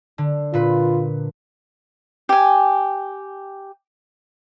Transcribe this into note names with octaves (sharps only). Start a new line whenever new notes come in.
D3
A#2 F4 B4
G4 G#5